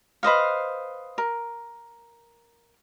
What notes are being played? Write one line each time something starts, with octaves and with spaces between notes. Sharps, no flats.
B4 C5 D#5 F5
A#4